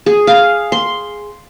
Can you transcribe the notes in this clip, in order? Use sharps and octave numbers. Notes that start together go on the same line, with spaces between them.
G#4
F5
C6